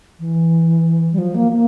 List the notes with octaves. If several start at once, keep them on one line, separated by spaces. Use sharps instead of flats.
E3
G3
F3
A#3
A#3